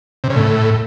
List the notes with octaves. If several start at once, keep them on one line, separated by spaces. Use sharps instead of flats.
C3
C#3
A2